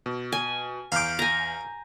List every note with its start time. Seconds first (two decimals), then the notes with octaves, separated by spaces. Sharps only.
0.06 B2
0.32 G#5
0.92 E2 F5 D6 F6 G6
1.19 G#5 A#5